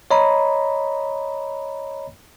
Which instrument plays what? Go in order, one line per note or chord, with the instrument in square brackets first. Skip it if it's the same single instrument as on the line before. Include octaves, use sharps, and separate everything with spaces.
[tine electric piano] C#5 D#5 A#5 B5